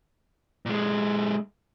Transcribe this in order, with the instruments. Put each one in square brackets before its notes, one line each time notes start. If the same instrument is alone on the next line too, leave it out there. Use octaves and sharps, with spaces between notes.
[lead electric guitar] A#2 G#3